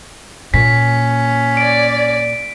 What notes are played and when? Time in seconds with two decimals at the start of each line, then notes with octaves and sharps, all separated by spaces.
0.54 A#2 C#4 B6
1.57 D5 D7